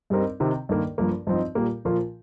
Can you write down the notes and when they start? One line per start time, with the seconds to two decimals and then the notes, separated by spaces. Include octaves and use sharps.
0.10 G2 G3 C4 D#4 A#4
0.40 C3 D#3 C4
0.69 G2 D#3 A#3
0.98 G2 F3 A#3
1.27 G2 F3 C4 D#4
1.55 A#2 G3 A#3 G4
1.85 A#2 F3 A#3 F4 A#4